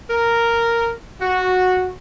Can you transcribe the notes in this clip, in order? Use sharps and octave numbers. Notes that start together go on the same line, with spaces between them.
A#4
F#4